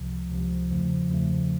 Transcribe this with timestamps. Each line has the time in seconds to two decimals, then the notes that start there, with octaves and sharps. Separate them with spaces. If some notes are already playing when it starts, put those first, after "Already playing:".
Already playing: C#2 C3 F3
0.29 C#2 C3 F3
0.69 E2 C#3 F3 A3
1.09 E2 C#3 F3 A3